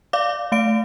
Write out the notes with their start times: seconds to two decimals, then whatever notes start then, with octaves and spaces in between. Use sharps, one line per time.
0.13 D5 F5 D6
0.52 A3 F5 D7